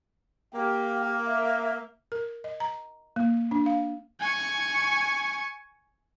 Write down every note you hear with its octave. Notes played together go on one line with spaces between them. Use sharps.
A#3 G4
E5
A#4
D#5
A#5
A#3
D4
F5
G#5 C#6